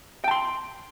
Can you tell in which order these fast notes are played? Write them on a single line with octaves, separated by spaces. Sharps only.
G5 A5 C6